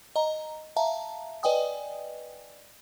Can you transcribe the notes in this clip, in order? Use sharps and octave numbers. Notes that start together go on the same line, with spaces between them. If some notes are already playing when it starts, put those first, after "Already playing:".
D#5 A#5
E5 F5 A5 A#5
B4 D5 D#5 G5 G#5 D#6